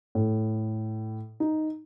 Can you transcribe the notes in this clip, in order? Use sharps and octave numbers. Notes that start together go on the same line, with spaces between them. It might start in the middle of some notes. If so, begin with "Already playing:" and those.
A2
D#4